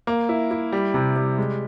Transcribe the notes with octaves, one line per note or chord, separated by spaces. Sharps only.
A#3
E4
E4
G3
C3
G3
G#3